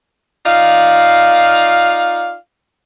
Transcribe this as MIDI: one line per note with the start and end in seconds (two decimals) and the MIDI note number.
0.45 2.34 63
0.45 2.34 65
0.45 2.34 74
0.45 2.34 77